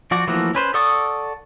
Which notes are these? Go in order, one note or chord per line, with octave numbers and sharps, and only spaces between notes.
F3 F#4 D5
E3 F3 A3 A#3 F#4
C#4 B4 C5
A4 D5 F#5 C#6 D#6